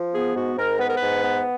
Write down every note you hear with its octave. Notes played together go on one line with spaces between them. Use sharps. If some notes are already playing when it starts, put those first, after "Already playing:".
Already playing: F3
B3 G#4
G#2 F#4
G#2 A#4
B3 B4
A#4
B4
G#2
B3